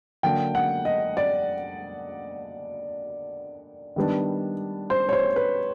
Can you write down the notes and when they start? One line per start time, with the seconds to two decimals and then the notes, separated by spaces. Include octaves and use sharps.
0.23 D3 F#3 A#3 D4 G5
0.55 F#5
0.85 D#5
1.17 D5
3.96 D#3 G3 B3 D4
4.90 C5
5.09 C#5
5.13 C5
5.36 B4